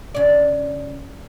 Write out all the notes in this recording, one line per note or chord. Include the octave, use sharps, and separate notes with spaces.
C#3 D5